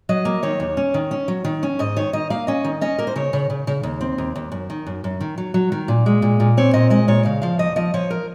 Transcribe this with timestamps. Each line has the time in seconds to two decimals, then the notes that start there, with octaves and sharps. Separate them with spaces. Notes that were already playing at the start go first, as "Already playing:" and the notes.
0.09 F#3 D#5
0.25 A#3
0.43 D#3 C#5
0.60 D#2
0.77 C#4
0.94 D#3
1.11 C#4
1.28 F#3
1.45 D#3
1.63 C#4
1.79 G#2 D#5
1.96 D#3 C#5
2.13 D#3 D#5
2.30 A#3 F5
2.47 C#4 D#5
2.64 D#3
2.81 C#4 D#5
2.98 A#3 A#4
3.07 C5
3.16 C#3 C#5
3.33 C#3
3.50 C#3
3.67 C#3
3.83 D#2
4.01 C4
4.18 D#2
4.36 D#2
4.52 F#2
4.70 D#3
4.87 F#2
5.04 F#2
5.21 D#3
5.38 F#3
5.54 F#3
5.72 D#3
5.88 A#2
6.06 G#3
6.22 A#2
6.40 A#2
6.57 C4 C#5
6.74 A#2 D#5
6.90 G#3 D#5
7.08 A#2 C#5
7.25 C#3 F5
7.42 F3 F5
7.59 D#2 D#5
7.76 F3 D#5
7.94 F3 C#5
8.10 A#4